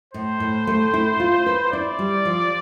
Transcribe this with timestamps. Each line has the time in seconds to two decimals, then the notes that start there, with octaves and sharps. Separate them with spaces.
0.14 A2 C5
0.40 A2
0.67 A3
0.94 E4
1.20 F4
1.46 B4
1.73 E4 D5
1.99 G3
2.25 F3